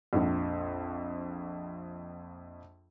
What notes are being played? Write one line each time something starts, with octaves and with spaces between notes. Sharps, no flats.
A#1 F2